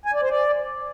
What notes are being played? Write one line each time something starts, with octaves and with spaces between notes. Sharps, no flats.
G#5
D5
C5
D5